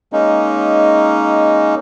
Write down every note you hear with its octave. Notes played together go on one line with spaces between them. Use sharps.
G#3 A#3 C#4 D#4